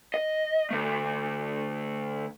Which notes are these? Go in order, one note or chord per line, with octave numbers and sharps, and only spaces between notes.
D#5
D3 A3